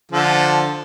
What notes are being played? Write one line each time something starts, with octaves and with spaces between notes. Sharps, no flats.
D3 F3 A4